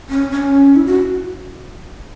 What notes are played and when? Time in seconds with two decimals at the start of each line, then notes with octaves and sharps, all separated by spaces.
0.10 C#4
0.32 C#4
0.76 E4
0.86 F#4